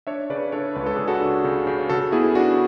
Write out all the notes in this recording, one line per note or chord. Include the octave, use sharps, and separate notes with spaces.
D4 C#5 E5
C#3 B4 D5
D4 A4 C#5
C#2 B4
A4
C#3 G#4
F#4 A4
D4
C#3
C#3
C#3 F#4 A4
B3 E4 G#4
D4 F#4